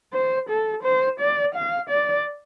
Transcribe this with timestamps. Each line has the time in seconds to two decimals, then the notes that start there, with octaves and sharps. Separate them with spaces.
0.13 C5
0.49 A4
0.83 C5
1.20 D5
1.55 F5
1.90 D5